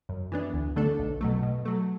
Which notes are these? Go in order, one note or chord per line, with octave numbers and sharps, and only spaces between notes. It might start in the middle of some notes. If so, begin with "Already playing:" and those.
F#2
E3 B3 D4
D2
D3 A3 D4 A4
B1
B2 F#3 A3
B2
F#3 A3